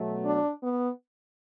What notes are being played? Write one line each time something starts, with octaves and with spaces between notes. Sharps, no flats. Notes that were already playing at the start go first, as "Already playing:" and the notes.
Already playing: B2 F#3 A3
D4
B3